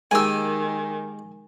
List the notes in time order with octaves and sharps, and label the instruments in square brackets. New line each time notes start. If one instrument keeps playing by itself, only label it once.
[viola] D#3 [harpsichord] G#3 A#3 G4 [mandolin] G#5 E6